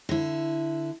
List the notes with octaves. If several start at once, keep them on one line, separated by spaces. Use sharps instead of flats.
D3 E4